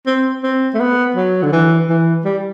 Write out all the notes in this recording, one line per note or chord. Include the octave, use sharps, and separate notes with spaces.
C4
C4
A3
B3
F#3
D3
E3
E3
G3